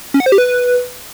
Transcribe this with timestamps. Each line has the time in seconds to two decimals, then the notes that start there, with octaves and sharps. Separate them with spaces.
0.14 C#4
0.20 F#5
0.26 C5
0.32 G4
0.38 B4